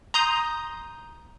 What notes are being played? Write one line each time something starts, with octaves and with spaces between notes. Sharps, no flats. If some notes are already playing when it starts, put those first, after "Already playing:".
A#5 C6 D#6 G6